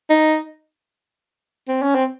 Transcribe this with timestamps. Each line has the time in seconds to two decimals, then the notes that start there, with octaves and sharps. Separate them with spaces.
0.10 D#4
1.68 C4
1.82 C#4
1.95 C4